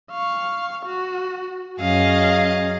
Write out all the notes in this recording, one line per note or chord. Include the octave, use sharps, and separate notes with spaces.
F5 C#6
F#4
F#2 C#4 G#4 D#5 F5